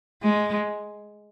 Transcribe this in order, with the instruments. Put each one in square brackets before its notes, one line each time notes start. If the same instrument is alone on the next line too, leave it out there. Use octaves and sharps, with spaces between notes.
[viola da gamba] G#3